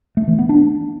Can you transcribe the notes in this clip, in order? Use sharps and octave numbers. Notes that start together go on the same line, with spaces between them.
A3
E3
B3
D4